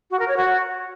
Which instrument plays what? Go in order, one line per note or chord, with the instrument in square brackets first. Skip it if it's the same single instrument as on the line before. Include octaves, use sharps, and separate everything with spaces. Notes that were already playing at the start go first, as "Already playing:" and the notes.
[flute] F#4
A#4
C#5
F#4